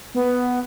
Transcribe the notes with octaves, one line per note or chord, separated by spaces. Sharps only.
B3